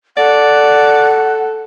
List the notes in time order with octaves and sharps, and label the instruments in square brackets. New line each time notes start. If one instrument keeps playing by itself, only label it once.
[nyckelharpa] A4 [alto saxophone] D5 [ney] F#5